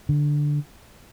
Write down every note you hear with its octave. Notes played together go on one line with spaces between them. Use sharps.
D3